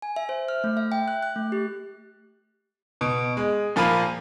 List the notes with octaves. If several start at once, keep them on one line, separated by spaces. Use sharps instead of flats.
G#5
E5
C5
F6
A3
E5
G5
F#6
F#6
A3
G4
B2
G#3
A#2 F3 A#3 F4 B5 D#7